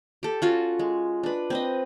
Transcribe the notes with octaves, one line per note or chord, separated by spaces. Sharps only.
G4 A4
C#4 F4 F#4
G#3
D4 B4
C4 B4 D#5